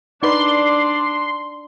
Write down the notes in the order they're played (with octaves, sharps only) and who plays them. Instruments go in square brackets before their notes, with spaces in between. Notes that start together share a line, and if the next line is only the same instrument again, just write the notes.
[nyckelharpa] D4 [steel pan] D#4 B4 [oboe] D5 [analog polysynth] C6